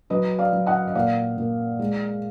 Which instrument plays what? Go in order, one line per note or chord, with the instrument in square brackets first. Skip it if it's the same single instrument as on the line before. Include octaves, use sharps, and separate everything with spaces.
[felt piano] F#3 B4 D#5
D5 F5
F#3
D#5 F#5
D#5
A#2 D5 F5
A#2
G#3